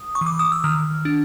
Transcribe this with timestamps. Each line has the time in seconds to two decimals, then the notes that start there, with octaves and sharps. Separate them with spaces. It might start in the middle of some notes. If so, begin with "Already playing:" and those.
Already playing: D#6
0.15 C#6
0.21 E3
0.26 D6
0.39 D#6
0.52 E6
0.64 D#3 F6
1.05 D4